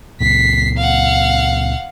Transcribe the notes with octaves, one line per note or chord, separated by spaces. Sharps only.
C#2 A#2 B6 C7
F5 F#5